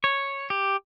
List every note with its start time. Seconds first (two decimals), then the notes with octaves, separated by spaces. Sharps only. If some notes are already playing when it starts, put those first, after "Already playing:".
0.04 C#5
0.50 G4